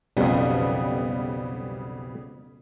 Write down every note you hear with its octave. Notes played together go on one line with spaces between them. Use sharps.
B1 F2 C#3 G3 B3